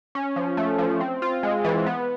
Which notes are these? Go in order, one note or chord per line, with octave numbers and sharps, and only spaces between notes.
C#4
F3
A3
F3
C4
F4
G#3
E3
B3